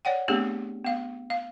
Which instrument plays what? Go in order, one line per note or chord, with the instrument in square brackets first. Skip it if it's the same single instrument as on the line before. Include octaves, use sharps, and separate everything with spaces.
[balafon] C#5 D5 F#5 G5
A3 B3 C4 D4 G4 G#4
B3 F5
F5